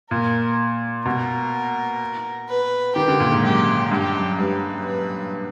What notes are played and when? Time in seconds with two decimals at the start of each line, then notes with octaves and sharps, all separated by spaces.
0.11 A#2 A#4
1.06 B2 A#4
2.49 B4
2.96 D#3 G4
3.08 D3
3.20 A#2
3.32 G#2
3.44 F#2 G4
3.91 G2 G4
4.15 F#2
4.39 G2 B4
4.87 B4